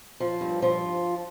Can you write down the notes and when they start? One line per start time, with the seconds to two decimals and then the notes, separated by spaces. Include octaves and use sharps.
0.20 F3
0.41 G2
0.62 F3